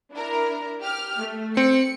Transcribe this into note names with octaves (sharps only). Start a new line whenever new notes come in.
D4 E4 A#4
G4 F6
A3
C4 C#7